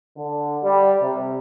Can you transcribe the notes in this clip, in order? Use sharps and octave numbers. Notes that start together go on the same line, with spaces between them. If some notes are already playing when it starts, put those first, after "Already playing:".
D3
G3
C3